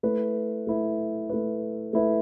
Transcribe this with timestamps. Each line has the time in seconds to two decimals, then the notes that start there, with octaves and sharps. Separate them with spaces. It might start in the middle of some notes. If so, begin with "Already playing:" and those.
0.03 A3 E4 B4
0.67 A3 E4 B4
1.30 A3 E4 B4
1.93 A3 E4 B4